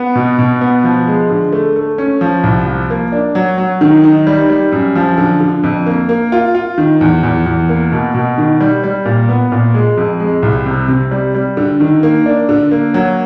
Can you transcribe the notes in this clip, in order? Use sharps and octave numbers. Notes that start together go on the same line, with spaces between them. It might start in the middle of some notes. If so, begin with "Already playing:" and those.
Already playing: B3
B2
B2
B3
F3
G#3
D3
A3
A3
C#4
F3
C2
F3
A#3
D4
F#3
F#3
D#3
D#4
G3
G3
F#2
F3
D3
D3
F2
A#3
A#3
F4
F4
D#3
E2
E2
E2
A#3
B2
B2
D#3
G3
G3
A#2
B3
A#2
G#3
F2
G#3
C2
C3
C3
G3
G3
D3
D#3
A#3
D4
D3
A#3
F#3